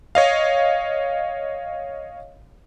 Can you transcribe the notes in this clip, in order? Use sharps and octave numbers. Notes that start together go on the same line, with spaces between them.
C#5 D#5 F5